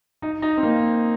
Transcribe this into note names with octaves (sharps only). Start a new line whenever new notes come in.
D#4
D#4
C4
A#3